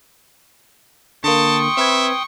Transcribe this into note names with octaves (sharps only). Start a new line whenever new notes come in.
D3 A#3 G5 A5 C6 C#6 D#6
C4 B4 E5 G#6